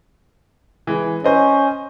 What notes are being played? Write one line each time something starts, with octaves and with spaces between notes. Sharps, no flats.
E3 G#3
C#4 C5 D#5